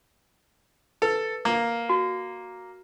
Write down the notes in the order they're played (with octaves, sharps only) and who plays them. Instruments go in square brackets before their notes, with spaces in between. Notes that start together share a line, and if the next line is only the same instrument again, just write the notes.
[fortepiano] A4 [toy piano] B4
[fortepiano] A#3
[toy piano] F#4